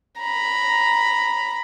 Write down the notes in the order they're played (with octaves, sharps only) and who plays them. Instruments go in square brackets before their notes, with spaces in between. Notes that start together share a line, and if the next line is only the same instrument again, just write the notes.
[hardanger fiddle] A#5 B5